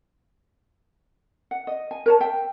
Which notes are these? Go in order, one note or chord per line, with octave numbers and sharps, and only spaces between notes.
F#5
D#5
G#5
A#4 C#5 A5
E5 G5